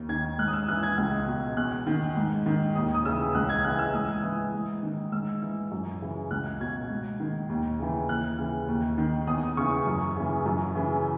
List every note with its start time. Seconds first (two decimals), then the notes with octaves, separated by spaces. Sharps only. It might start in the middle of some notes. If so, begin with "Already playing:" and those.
Already playing: D#2
0.09 D#3 G#6
0.39 G#2 F#6
0.48 D#6
0.53 E6
0.68 E3 F#6
0.83 G#6
0.98 C#2
1.28 B2
1.57 E2 F#6
1.87 D#3
2.17 G#2
2.46 D#3
2.75 D#2 D#6
2.95 D#6
3.05 C#3 E3 E6
3.35 C#2 F#6
3.49 G#6
3.64 C#3 E3 F#6
3.79 E6
3.94 G#2 D#6
4.24 E3
4.53 G#2
4.83 D#3
5.12 G#2 E6
5.42 E3
5.72 F#2
6.01 C#3 E3
6.31 C#2 F#6
6.61 B2 G#6
6.90 G#2
7.20 D#3
7.50 D#2
7.79 C#3 E3
8.09 D#2 F#6
8.39 C#3 E3
8.68 D#2
8.98 D#3
9.27 E2 D#6
9.57 C#3 E3 C#6
9.87 F#2
10.16 C#3 E3
10.46 F#2
10.76 C#3 E3